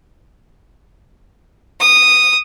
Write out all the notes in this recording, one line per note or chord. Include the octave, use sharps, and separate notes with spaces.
D#6